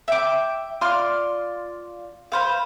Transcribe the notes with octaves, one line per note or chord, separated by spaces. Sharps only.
E5 G5 D6
F4 D5 C6 F6
B4 C5 F5